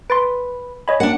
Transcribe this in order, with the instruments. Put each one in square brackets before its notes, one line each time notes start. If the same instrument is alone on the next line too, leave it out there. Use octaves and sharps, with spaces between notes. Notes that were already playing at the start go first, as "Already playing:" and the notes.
[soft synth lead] B4 [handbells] C6 A6 D7
[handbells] C#5 D#5 B5 [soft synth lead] G#5
[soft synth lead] A#3 [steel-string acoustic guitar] D4 F#5